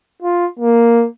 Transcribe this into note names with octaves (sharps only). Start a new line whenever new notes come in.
F4
A#3